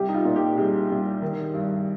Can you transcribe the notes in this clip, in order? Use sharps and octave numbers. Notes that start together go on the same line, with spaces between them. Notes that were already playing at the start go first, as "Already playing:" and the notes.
Already playing: C2 G4
D#4
F4
A#2
G4
C2 G#4
C2
D#3
G2